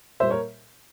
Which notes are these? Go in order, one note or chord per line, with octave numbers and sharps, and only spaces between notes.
A#2 G3 A#3 C5 E5
A#4 C#5